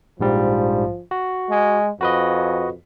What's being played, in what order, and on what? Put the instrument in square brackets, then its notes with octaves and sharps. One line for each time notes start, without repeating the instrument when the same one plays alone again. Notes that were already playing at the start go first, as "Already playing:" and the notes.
[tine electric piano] A#1 G#2 G3 [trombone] F3
[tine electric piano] F#4
[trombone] G#3
[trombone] F2 [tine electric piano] F#4 B4 D#5